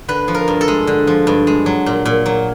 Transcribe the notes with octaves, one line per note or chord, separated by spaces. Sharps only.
D3 B4
F3
A#4
G2
A4
G#3
D3
F3
G2
G#3
F#3
A#2
A#2
F#3